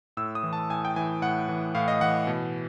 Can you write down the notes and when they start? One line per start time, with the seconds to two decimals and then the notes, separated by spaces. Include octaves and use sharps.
0.17 A2 E6
0.35 D#6
0.43 E3
0.53 A5
0.70 A2 G#5
0.85 G5
0.96 E3 G#5
1.22 A2 F#5
1.49 E3
1.75 A2 F5
1.88 D#5
2.01 E3 F#5
2.27 B2